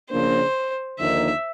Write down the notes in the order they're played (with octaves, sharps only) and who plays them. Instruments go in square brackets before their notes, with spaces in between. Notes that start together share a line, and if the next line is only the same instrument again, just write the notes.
[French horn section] C#3 F3 A#3 D4 [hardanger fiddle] C5
[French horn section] D#2 D3 F3 A#3 D#4 [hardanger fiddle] E5